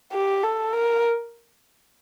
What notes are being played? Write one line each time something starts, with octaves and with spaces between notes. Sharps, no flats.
G4
A4
A#4